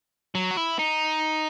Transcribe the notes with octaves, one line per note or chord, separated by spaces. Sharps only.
F#3
F#4
E4
D#4